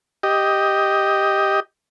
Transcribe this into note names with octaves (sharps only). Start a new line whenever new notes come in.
G4 D#5